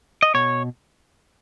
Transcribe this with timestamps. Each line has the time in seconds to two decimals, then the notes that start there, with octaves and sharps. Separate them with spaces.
0.23 D#5
0.34 B2 C#5